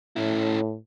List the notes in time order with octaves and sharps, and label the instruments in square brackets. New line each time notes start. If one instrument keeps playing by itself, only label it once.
[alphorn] A2 [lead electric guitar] C#4 E4